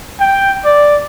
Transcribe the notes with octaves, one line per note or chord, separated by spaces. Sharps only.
G5
D5